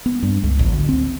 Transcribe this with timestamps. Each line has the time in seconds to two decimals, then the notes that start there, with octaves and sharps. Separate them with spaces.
0.06 B3
0.23 G2
0.43 C#2
0.59 A1
0.73 D2
0.89 C4